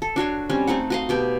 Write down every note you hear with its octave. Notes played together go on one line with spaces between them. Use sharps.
A4
D4 F#4 C#5 C6
G3 C4 C#4
A3 C4 D#4 F#5
F#4 D#5 F5
B2 G4 G5